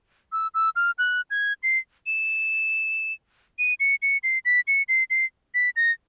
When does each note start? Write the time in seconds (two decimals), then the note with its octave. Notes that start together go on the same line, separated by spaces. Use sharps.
0.32 E6
0.54 E6
0.76 F6
0.98 F#6
1.30 G#6
1.63 C7
2.07 E7
3.59 D#7
3.80 C#7
4.02 C#7
4.24 C7
4.45 B6
4.67 C#7
4.89 C7
5.10 C7
5.55 B6
5.76 A#6